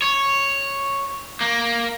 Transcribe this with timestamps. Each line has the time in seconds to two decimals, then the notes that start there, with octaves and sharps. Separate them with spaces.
0.02 C#5
1.41 A#3